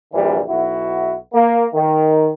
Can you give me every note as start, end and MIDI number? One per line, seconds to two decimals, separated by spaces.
0.13 0.40 34
0.13 0.40 42
0.13 0.40 50
0.13 0.40 52
0.13 0.40 54
0.13 0.40 55
0.49 1.16 35
0.49 1.16 64
0.49 1.16 66
1.33 1.64 58
1.74 2.30 51